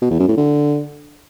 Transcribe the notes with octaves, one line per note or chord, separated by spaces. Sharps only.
B2
E2
F#2
A2
D3